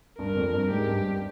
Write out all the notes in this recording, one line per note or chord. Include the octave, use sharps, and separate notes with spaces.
G2 A#4
F2
G2
G#2 G4
G2
G2